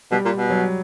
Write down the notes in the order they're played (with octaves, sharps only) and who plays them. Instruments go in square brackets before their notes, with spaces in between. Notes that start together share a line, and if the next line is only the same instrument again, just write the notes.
[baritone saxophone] B2 [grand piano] G3
[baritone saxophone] A#2
B2
[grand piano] F#3